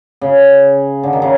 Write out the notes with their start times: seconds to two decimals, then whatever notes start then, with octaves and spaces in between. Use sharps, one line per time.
0.21 C#3
1.03 D3
1.13 D#3
1.22 C#3